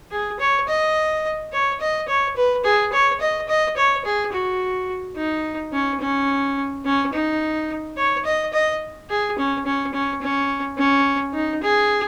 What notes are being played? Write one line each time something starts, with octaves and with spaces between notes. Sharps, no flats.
G#4
C#5
D#5
C#5
D#5
C#5
B4
G#4
C#5
D#5
D#5
C#5
G#4
F#4
D#4
C#4
C#4
C#4
D#4
C#5
D#5
D#5
G#4
C#4
C#4
C#4
C#4
C#4
D#4
G#4